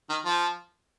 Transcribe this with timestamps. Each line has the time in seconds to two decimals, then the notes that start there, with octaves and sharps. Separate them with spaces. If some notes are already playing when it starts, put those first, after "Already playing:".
0.10 D#3
0.25 F3